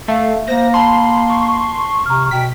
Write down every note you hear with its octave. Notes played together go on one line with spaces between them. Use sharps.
A3 E5 F5
A#3 C5 A#6
A5 B5 C6
C#6
C3 A#5 F6
B2 G5 B6